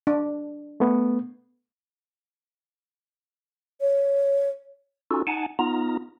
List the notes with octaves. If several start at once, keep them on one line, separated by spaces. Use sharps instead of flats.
D4
A3 B3
C#5
C#4 D#4 F4 F#4 A4
D#4 F#5 G#5 A5
B3 D#4 F4 A#5